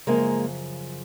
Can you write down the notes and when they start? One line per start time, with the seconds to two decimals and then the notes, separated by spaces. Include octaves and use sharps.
0.07 F#2 C#3 F3 G#3 A#3